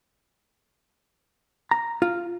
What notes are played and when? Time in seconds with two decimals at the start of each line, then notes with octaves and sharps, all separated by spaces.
1.71 A#5
2.02 F4